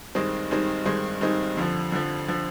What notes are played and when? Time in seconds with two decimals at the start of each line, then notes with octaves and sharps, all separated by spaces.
0.15 G2 D#3 G#3 C4 D#4
0.51 G2 D#3 G#3 C4 D#4
0.85 G2 D#3 G#3 C4 D#4
1.21 G2 D#3 G#3 C4 D#4
1.57 F2 D3 F3
1.92 F2 D3 F3
2.28 D3 F3